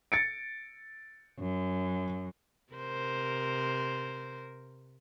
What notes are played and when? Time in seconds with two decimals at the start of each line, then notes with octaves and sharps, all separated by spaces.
0.12 A6 C#7 D7
1.39 F#2
2.73 C3 A#4 C5